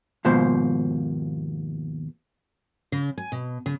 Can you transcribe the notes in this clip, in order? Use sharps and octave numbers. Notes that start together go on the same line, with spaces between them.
D#2 G#2 B2 F3 C5
C#3
G#5
B2
C#3